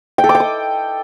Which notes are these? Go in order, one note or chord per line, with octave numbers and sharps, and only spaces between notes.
G5
A4
D6
G5
D#6